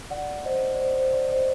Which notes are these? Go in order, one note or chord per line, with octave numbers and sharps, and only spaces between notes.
D5 F#5
C5 D#5
D5
C5
C5
D5
C5 D#5